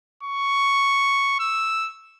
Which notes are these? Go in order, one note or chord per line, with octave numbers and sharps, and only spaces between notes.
C#6
E6